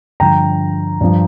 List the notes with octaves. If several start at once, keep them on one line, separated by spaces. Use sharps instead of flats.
G2 D3 F3 G5 A#5
G2 F3